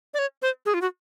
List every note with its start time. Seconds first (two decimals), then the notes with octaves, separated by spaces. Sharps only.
0.14 D5
0.19 C#5
0.42 C5
0.66 G#4
0.74 F4
0.81 F#4